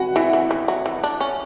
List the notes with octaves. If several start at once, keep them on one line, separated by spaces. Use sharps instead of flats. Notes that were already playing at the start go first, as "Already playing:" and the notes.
Already playing: F#4 B4 F#5 G#5
E3 E4 E5
E3
E3
F#3
E3
D4
C#4